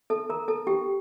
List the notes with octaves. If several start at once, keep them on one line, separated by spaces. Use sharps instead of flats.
A4 A5
A#4 A#5
A4 A5
G4 G5